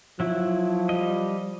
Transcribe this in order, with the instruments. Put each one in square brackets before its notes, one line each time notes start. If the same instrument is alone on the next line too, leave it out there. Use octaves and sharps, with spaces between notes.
[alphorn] F3 [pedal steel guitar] F#3 E4
[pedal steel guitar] G3 D#5